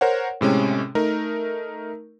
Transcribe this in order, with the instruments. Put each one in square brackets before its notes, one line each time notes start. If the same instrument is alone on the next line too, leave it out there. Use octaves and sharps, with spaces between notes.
[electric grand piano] A#4 C5 C#5 F#5
A2 C3 G#3 C#4
A3 D#4 A#4